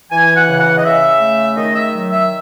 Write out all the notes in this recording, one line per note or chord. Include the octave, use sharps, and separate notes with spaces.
E3 G#5
F#5
C#3
F#5
D#5
C#3 E5
A3
D#3 D#5
E5
F#3
E5